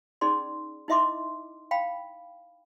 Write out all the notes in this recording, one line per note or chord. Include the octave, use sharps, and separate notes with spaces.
C#4 D#4 G#4 D5 C6
D#4 E4 D#5 E5 C6 D6
F5 G5 B5